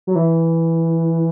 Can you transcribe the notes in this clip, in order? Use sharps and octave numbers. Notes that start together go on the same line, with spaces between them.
F#3
E3